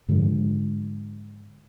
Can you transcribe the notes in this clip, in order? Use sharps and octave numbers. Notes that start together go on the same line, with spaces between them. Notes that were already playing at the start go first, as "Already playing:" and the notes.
G#2 D3 F3 G#3